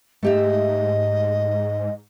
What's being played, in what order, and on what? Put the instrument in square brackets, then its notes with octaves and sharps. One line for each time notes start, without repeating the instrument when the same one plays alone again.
[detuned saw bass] G#2 [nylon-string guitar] A3 G4 E5 [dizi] D#5